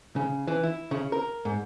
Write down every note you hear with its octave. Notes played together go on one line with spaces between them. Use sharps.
C#3
E3
E4
C#3
A#4
G#2